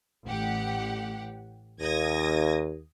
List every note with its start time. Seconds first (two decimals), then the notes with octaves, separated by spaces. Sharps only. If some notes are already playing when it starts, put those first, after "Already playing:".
0.24 A1 G4 F#5
1.80 D#2 D#6 G#6 A#6